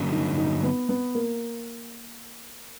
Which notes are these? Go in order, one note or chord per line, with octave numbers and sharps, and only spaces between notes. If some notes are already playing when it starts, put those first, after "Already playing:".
Already playing: G2 D3 F#3 A#3 C#4
D#4
D#4
B3
B3
A#3